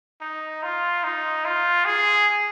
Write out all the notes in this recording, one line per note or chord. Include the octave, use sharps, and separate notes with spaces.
D#4
F4
D#4
F4
G#4